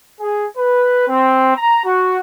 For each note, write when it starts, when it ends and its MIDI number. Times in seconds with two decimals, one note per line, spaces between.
0.20 0.46 68
0.57 1.04 71
1.09 1.52 60
1.55 1.84 82
1.85 2.18 66